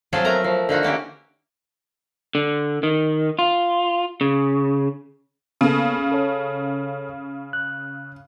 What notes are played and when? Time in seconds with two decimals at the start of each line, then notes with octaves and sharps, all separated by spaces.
0.13 F3 F#3 C4 F4 G#4 A4
0.25 A3 B3 A#4 A#5
0.44 F3
0.69 D3 D#4 F4 F#4
0.83 E3 A#3 C#4 G4
2.35 D3
2.83 D#3
3.39 F4
4.21 C#3
5.61 C#3 A#3 B3 A4
6.12 A4 C#5
7.53 F#6